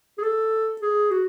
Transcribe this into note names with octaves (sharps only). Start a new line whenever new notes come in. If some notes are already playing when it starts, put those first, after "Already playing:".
G#4
A4
G#4
F#4